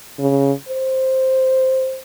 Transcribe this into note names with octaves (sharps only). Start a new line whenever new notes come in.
C#3
C5